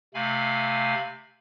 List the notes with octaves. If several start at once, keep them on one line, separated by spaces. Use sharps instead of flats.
C3 A3 F5 G#5 B5